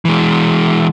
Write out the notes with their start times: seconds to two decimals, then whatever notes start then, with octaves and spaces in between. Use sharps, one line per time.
0.05 E3 G#3